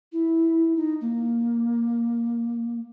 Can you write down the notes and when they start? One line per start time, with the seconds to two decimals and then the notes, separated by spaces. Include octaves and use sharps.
0.13 E4
0.76 D#4
1.01 A#3